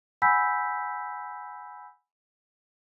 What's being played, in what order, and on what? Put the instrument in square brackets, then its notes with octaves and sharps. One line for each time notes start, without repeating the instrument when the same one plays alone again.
[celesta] F#5 G#5 B5 E6 G6 B6